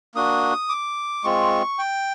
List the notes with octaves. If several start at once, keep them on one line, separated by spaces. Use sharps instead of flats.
A#3 D4 F#4 D#6
D6
G#3 C4 F4 C#6
G5